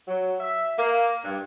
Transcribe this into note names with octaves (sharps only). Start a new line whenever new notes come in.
F#3
E5
A#3
G2